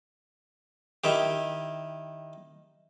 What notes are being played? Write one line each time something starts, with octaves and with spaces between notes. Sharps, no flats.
D#3 E4 G4